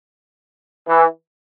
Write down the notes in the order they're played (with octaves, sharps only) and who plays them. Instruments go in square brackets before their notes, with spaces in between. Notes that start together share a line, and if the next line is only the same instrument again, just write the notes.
[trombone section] E3